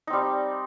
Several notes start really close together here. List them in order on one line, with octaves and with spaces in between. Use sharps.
D#4 C4 G3